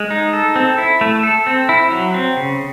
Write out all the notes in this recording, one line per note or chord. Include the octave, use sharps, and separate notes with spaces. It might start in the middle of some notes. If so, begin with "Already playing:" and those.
Already playing: G#3
D#4
A4
C4
E4
A3
A4
C4
E4
F#3
C4
C#3